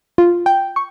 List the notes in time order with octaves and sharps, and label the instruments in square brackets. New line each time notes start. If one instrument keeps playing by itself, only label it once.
[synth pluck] F4
G5
C#6